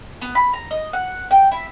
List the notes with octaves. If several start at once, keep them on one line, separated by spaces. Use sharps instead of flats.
B3
B5
A#5
D#5
F#5
G5
E4